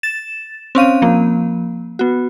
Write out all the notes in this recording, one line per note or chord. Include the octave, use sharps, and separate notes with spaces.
A6 E7
C4 C#4 F5 D#7
F3 A#3
B3 F#4